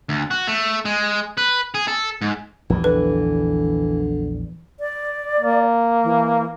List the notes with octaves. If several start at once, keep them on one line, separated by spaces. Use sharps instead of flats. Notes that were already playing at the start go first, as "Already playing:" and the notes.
D2
F#4
A3
G#3
B4
G#4
A4
G#2
A#1 E2 E3 G3
D3 B4
D5
A#3
E3